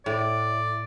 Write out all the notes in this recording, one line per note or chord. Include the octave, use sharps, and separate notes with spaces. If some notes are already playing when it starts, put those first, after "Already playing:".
A2 D5